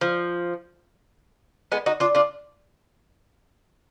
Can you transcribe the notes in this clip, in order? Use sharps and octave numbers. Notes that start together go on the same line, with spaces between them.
F3
G#3 B3
D#4 F#4
D4 F4
D4 F4